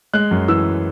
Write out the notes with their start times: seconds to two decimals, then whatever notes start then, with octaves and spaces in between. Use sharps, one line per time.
0.13 G#3 F#6
0.31 F#2
0.48 E3 E6